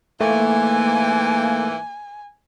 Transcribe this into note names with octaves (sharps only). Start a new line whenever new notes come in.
G#2 E3 A3 A#3 G#5